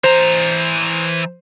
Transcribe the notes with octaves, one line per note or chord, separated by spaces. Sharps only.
E3 C5 A#5